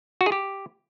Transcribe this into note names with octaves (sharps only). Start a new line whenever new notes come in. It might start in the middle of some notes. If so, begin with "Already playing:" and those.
F#4
G#4
G4